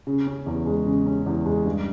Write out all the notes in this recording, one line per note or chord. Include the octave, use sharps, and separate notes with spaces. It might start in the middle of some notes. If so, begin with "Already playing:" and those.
C#3
C#4
E2
G#3
C#3
C#4
E2
G#3
G2